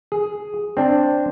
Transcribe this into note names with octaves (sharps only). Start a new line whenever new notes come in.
G#4
C4 D4